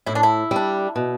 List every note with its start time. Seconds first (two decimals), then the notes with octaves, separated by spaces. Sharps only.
0.06 A2 E4
0.15 D4
0.23 E4
0.51 G3 D4
0.96 B2